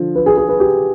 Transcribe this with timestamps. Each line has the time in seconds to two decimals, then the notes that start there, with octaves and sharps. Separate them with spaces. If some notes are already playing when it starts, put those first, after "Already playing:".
Already playing: D3 F3
0.15 B4
0.26 G#4
0.37 G#4
0.49 B4
0.60 G4